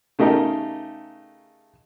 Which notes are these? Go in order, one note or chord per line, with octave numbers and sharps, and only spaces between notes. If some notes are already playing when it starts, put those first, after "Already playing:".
C#3 A3 D#4 G4 A#4